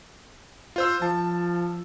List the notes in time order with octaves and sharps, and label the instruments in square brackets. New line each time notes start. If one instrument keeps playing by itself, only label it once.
[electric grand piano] F4 C5 E6
[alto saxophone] F3 [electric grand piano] A5